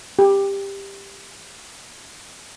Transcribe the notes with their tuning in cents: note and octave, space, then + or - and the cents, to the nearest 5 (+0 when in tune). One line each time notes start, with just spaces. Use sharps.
G4 +10